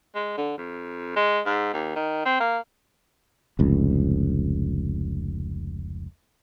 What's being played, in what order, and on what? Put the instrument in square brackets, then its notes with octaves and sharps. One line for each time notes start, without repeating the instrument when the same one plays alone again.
[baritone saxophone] G#3
D3
F2
G#3
G#2
D#2
D#3
C4
A#3
[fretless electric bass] F1 C#2